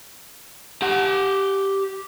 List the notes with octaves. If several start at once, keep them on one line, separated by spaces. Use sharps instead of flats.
G4 F#5